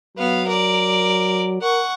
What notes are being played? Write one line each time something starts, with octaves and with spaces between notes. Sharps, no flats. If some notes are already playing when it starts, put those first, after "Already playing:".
F#3 B3 F5
A#4 D5
A#4 F#5 C#6